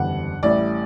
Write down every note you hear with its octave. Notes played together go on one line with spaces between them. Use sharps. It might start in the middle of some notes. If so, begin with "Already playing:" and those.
Already playing: F#1 E2 D3 G3 F#5
A1 A2 G3 D5